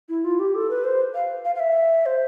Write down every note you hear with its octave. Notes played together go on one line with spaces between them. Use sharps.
E4
F4
G4
A4
B4
C5
F5
F5
F5
E5
C5